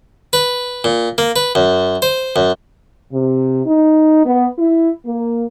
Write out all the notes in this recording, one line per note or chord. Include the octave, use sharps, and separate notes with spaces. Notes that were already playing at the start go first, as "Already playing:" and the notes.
B4
A#2
A#3
B4
F#2
C5
F#2
C3
D#4
B3
E4
A#3